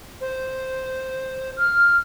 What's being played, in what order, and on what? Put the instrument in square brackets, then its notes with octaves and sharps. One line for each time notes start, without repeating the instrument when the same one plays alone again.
[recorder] C5
[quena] F6